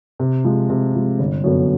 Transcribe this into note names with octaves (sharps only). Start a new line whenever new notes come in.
C3
F3 G#3
C3
F3 G#3
G1
F#2 D3 F#3 B3